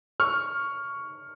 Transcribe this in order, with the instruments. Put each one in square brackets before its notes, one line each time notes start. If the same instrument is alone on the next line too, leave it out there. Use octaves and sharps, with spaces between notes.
[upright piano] C#6 F6